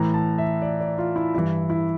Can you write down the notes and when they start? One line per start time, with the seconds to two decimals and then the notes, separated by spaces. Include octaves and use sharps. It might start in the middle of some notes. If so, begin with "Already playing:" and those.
Already playing: A2 E3 A#5
0.14 A5
0.38 E5
0.62 D5
0.80 D5
0.98 F4
1.16 E4
1.34 G2 E3 E4
1.70 E4